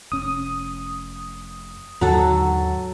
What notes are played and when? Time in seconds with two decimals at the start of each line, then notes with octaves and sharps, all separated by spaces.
0.12 F1 C#4 D#6
2.01 D#2 G#2 D3 D#3 F#3 A4 F#5